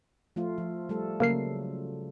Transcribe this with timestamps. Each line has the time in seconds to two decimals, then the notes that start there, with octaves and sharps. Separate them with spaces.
0.36 F3 A3 F4
0.58 F3
0.89 G3 A3 A4
1.20 C#3 F#3 A#3 A#4 C7